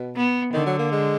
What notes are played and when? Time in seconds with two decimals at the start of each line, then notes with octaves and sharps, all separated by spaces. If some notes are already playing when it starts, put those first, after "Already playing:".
Already playing: B2
0.16 B3
0.53 D3 D#3
0.66 F#3
0.79 A#3
0.92 G#3